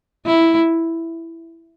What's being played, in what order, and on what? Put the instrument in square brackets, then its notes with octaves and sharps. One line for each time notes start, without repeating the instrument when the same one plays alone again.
[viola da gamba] E4